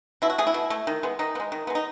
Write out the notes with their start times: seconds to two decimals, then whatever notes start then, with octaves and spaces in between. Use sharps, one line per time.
0.22 B2 E4
0.30 F#4
0.38 A3 G#4
0.47 E4
0.54 B2
0.70 A3
0.87 D#3
1.03 G#3 B3
1.19 D#3 D#4
1.35 B3
1.40 G#3
1.52 D#3
1.67 G#3 B3
1.75 D#4